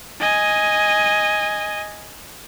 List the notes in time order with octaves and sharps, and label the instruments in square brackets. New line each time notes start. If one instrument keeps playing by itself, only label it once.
[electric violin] D#5 G#5